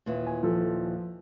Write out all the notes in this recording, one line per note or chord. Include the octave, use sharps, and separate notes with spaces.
D#2 A#2 E3
G#5
F3 A4